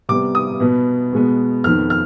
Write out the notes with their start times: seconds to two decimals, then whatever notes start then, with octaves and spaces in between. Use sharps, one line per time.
0.09 C3 G3 B3 D6
0.35 D#6
0.60 B2 B3
1.13 B2 G#3 B3
1.64 F2 D#3 B3 F6
1.90 F6